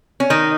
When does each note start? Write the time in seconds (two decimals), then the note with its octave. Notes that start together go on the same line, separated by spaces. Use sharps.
0.20 C#4
0.30 D#3 D#4